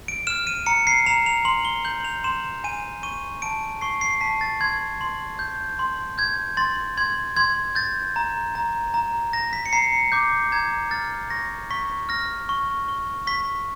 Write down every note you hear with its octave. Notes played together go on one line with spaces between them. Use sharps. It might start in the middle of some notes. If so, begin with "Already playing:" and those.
D7
F6 E7
D#7
A#5 C#7
C7
A#5 F7
F7
C6 F#7
G7
G6 F#7
F7
C6 E7
G#5 D#7
C#6 D#7
A5 D7
C#6 C7
C7
A5 B6
A6
C6 G#6
C6
G6
C6
G6 G#6
C6 A6
C6 G#6
C6 G#6
G6 A6
A#5
A#5
A#5
A#5 A#6
B6
C#7
A#5 C7
C#7
D6 G6
A#5 G#6
F6 A6
C#6 A#6
C#6 B6
F6 A#6
C#6
C#6
C#6 B6